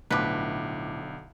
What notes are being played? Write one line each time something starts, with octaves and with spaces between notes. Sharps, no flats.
B1 A2 D3 F3 B4 D6